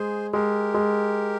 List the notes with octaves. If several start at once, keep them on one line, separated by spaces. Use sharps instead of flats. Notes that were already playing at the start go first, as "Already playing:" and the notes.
Already playing: G#3 G#4 C5
G#3 G4 A#4
G#3